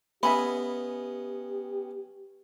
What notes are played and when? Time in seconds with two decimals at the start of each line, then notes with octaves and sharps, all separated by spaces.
0.23 B3 C#4 G4 D#5 E5 G#5 B5